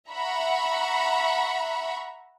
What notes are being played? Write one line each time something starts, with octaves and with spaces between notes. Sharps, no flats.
E5 F#5 A#5 B5 C#6